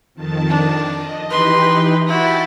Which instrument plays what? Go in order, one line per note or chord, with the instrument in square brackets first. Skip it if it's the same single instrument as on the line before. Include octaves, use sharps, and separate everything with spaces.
[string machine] F2 D#3 A5
[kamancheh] D4
[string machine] D#5
[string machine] E3 D#4 G4 [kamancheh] B4 C6
[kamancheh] E4 F#4 [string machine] G5 A6